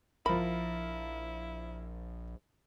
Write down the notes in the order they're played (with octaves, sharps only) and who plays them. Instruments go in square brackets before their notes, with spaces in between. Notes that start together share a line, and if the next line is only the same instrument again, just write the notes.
[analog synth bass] A#1 [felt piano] F3 A#4 [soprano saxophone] E4 [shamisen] B5